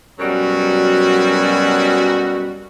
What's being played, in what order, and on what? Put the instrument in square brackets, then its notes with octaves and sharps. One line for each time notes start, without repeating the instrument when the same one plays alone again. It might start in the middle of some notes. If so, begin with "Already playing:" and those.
[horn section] F#2 B2 F#3 G3 F#4